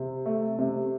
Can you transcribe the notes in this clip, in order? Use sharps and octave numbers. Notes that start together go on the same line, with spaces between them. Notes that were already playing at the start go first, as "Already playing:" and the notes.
Already playing: C3
A3
C3